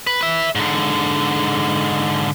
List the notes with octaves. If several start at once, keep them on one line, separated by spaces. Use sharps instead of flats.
B4
B4 E5
G#2 D3